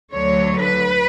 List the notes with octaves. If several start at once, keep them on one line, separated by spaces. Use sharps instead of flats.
D2 D3 F#3 C#5
B4